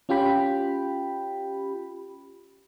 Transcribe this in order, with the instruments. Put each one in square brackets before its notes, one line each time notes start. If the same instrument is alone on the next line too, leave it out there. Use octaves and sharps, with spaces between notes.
[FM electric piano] C#4 F4 G4 G5 B5